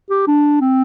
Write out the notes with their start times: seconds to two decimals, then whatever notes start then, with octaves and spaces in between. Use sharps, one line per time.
0.10 G4
0.27 D4
0.61 C4